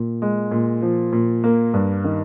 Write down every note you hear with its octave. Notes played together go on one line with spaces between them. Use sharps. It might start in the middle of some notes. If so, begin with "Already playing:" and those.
Already playing: A#2
G#3
A#2
F3
A#2
A#3
G2
D#3